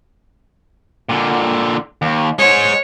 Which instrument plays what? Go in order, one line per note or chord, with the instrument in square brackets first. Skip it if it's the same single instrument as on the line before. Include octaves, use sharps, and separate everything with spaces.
[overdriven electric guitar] A#2 D3
D#2
[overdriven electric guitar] G#3 C5 [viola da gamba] C#5